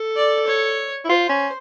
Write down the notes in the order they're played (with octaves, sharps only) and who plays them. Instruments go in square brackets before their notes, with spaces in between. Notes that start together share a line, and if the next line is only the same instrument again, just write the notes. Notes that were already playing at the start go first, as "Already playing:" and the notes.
Already playing: [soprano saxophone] A4
[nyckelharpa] D5
C#5
[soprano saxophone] E4
[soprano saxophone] F4 [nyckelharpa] C5
[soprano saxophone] C#4